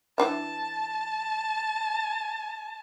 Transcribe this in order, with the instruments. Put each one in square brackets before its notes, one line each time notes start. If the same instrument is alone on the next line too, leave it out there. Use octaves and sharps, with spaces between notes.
[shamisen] E3 D4 E5 [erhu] A5